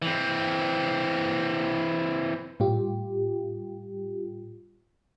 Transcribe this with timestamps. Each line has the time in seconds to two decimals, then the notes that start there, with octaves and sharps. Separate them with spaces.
0.02 E3 C4
2.60 A2 G3 F4 G4